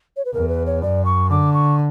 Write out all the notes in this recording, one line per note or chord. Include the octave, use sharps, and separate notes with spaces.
C#5
B4
E2 A#4
B4
C#5
F#2 D5
C#6
D3 D6
C#6